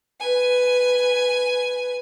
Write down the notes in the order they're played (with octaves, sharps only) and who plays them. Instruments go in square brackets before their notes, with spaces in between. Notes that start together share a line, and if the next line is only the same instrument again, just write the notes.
[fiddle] B4 G#5